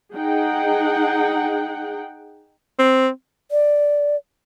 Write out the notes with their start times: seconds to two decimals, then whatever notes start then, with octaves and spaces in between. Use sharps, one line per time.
0.15 D#4 G#4 F#5 G5
2.79 C4
3.51 D5